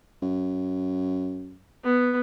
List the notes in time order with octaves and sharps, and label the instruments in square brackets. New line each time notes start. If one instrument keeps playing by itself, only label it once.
[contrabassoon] F#2
[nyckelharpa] B3